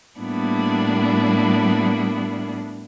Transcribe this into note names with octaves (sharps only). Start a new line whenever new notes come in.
A2 G3 A#3 B3 D4 E4